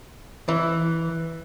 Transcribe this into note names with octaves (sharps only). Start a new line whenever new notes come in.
E3